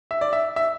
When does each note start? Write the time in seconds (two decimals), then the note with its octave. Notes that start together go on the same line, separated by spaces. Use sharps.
0.11 E5
0.21 D5
0.33 E5
0.56 E5